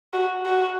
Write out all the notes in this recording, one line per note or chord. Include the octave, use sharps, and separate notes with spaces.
F#4
F#4